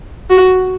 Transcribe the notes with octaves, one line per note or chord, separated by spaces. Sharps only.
F#4